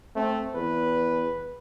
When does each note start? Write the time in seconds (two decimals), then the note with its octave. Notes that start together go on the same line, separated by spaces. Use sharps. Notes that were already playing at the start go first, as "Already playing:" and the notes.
0.16 A3 C4
0.55 E2 B4